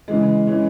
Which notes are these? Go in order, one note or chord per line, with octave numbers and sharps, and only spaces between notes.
C#3 E3 G#3
E3 G#3 C#4